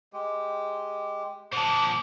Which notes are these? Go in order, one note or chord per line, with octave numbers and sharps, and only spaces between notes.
G#3 G4
A#2 D3 C5 F#5 A5 D6